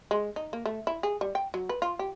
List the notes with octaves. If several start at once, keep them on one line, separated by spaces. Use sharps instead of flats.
G#3
D#4
A#3
A3
E4
G#4
G3
G5
F#3
B4
F4
G4